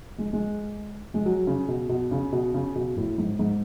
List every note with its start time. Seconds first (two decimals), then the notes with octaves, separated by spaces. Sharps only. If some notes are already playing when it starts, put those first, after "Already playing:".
0.18 G#3
0.33 G#3
1.14 G#3
1.26 F#3
1.47 C#3
1.68 B2
1.89 B2
2.11 C#3
2.32 B2
2.54 C#3
2.75 B2
2.97 A2
3.18 G#2
3.39 G#2